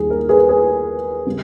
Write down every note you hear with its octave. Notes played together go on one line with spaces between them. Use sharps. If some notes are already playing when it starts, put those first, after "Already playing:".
Already playing: D#2 D#3 G3 G#4
A#4
G#4 B4
G#4 B4
C#3 G3